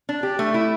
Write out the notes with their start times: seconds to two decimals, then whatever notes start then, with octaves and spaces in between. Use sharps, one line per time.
0.09 D4
0.23 G4
0.39 A3
0.54 E4